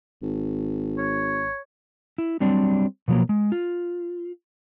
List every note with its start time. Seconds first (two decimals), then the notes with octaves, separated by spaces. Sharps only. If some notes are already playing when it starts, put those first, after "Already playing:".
0.22 G#1
0.98 C#5
2.18 E4
2.40 F#3 G3 C4 D4
3.08 B2 F3 F#3 A#3
3.29 G#3
3.52 F4